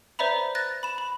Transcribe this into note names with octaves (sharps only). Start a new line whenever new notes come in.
B4 C5 D5 E5 A#5 B5
F#6 A6 A#6
B5 E7
B5